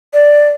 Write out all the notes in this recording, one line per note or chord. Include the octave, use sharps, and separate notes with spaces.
D5